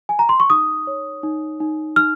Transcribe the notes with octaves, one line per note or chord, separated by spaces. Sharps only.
G#5
A#5
C6
C#6
D#4 D#6
C#5
D#4
D#4
D#4 F6